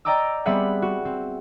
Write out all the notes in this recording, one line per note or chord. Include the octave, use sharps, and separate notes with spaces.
D5 D#5 G5 A#5 D6 E6
G3 B3 C4 G#4 E5 F#5
F#4
C4